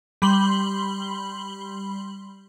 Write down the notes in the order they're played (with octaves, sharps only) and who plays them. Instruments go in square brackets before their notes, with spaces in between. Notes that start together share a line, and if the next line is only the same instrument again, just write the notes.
[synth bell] G3 B5 C6 F#7 G7